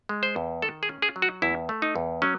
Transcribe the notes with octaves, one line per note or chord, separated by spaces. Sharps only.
G#3
C5
E2
D#3 A4
G#4
C#4
G#4
F#3
F#4
E2 E4
A3
D#4
E2
F#3 C#4